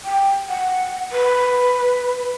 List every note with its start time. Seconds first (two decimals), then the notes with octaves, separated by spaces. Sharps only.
0.05 G5
0.49 F#5
1.12 B4